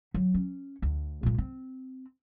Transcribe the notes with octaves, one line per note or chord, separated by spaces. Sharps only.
F#3
C#4
D2
A#2 G#3
C4